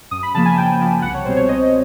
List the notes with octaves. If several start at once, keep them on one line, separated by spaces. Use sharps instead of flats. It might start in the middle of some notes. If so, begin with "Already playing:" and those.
F#2 D#6
B5
C#3 F3 A#3 A5
G#5
F#2 G5
C#3 F3 A#3
C2 F#5
C#5
B2 G3 C4 C5
C#5
C2 D#5